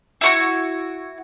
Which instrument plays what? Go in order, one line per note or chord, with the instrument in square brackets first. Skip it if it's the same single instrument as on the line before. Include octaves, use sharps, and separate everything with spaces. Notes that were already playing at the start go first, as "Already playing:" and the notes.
[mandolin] E4 F#4 C#6